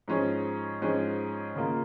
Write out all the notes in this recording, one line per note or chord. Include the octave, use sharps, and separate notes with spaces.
G#2 F3 C#4 G#4
G#2 F3 C#4 G#4
C#3 A#3 F4